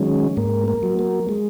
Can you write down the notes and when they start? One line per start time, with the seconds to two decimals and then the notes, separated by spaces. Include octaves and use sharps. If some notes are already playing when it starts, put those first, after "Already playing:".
Already playing: D#3 F#3 G#3 C#4
0.37 G#2 A#3
0.68 A#3
0.83 F#3
0.99 A#3
1.29 G#3